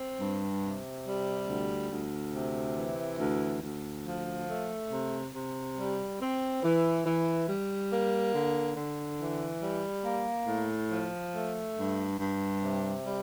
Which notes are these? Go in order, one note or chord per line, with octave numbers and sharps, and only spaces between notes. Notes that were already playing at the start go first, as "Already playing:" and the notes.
Already playing: C4
G2
C3
G3
D2
D2
C3
E3
D2
D2
F3
A3
C3
C3
G3
C4
E3
E3
G3
A#3
D3
D3
E3
G3
A#3
A2
F3
A3
G2
G2
C3
G3